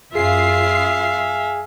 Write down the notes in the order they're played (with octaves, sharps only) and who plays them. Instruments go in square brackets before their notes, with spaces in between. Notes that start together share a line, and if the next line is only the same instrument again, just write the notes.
[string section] F#2 F4 C7 [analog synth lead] G#4 [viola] E5 F5